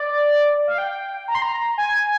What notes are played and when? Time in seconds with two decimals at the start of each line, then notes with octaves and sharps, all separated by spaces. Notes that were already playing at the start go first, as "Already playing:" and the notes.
Already playing: D5
0.67 F5
0.78 G5
1.28 A#5
1.35 C6
1.42 A#5
1.78 G#5